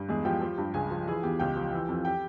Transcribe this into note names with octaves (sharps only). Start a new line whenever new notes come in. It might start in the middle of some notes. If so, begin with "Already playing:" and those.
Already playing: G2
E2 G#3 G#4
F3 G4 G5
F3
G2
C#2 G#4 G#5
F3
E3 G#4 G#5
E2 G4 G5
C#2 G4 G5
F3
E3
F2
G4 G5